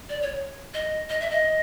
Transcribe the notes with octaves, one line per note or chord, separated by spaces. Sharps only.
D5
C#5
D#5
D#5
E5
D#5